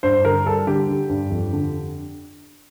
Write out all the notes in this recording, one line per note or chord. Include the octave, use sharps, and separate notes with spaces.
G2 C5
D3 A#4
G3 A4
D3 G4
D3
G2
F2
D3